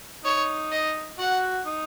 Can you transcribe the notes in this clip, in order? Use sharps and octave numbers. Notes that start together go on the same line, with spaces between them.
D#4 C#5
D#5
F#4 F#5
D#4